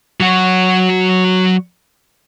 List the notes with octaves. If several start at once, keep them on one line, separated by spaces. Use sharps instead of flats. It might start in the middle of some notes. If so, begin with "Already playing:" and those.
F#3 F#4